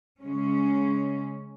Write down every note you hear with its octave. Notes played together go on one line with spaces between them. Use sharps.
C#3 G#3 C#4